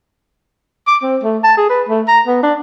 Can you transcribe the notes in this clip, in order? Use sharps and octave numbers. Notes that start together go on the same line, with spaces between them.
D6
C4
A3
A5
G#4
B4
A3
A#5
B3
D4